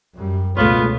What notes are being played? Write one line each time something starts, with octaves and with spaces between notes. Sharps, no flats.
F#2 G3
C#2 B2 A3 B3 F4 C#5